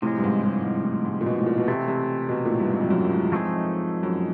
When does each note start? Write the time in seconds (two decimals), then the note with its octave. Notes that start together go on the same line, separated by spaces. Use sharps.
0.02 A2 C3 F3 G#3
0.18 G2
0.23 G#2
0.43 G2
0.64 G#2
0.84 A2
1.05 G#2
1.21 A#2
1.26 B2
1.39 A2
1.46 A#2
1.58 B2
1.68 C3 E3 A3 C4
1.88 C3
2.29 B2
2.45 A#2
2.50 A2
2.60 G2
2.70 G#2
2.81 F2
2.90 F#2
3.11 G#2
3.32 F3 A3 C4 D#4 G#4
4.03 F#2